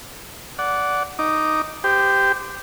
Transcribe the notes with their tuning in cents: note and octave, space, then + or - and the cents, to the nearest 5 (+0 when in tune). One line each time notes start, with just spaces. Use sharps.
D5 -15 F#5 +0
D#4 +0 D6 +0
G4 +0 C5 -30